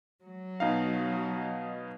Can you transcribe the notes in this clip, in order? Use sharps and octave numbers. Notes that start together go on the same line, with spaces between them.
F#3
B2 D#4 F5